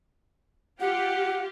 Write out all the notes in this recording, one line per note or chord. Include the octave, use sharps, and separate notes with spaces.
F4 G4 F#5